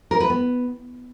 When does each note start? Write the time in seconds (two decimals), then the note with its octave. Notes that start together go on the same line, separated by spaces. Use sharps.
0.11 A#4
0.20 B4
0.30 B3